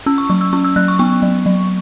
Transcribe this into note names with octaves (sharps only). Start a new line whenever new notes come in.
C#4 E6
C#6
F#3 C#6
E6
C#4 C#6
E6
F#3 F#6
C#6
B3 C#6
F#3
F#3